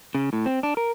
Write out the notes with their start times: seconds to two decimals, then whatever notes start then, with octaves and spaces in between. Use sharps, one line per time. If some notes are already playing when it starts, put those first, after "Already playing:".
0.15 C#3
0.33 A2
0.46 C4
0.63 D4
0.77 A#4